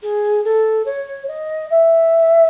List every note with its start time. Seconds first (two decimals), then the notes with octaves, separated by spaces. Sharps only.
0.02 G#4
0.44 A4
0.85 C#5
1.28 D#5
1.70 E5